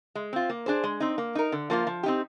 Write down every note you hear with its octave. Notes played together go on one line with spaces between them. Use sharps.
G#3
C4 F4
A#3
D4 G#4 C5
G#3
C4 D#4
A#3
D#4 A#4
D3
F3 A#3 F4
F3
C4 D#4 G4